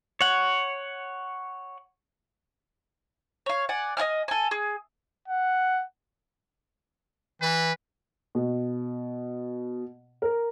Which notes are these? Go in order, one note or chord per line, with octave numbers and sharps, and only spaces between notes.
C#5 F#5
C#5 F5
D5 F#5 G#5
D#5 F#5 G#5 F6
A4 G#5
G#4
F#5
E3 B4
B2
A#4